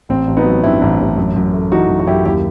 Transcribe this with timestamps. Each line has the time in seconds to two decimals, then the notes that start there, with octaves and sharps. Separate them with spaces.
0.09 A1 C4
0.27 A1
0.37 B3 D#4
0.46 F#3
0.63 G2 C4 E4
0.81 A1
1.00 A1
1.17 F#2
1.36 F#2
1.53 A3
1.72 E3 D#4 F#4
1.89 F#2
2.00 F#4
2.07 F#2 E4 G4
2.25 D#2 E4 G4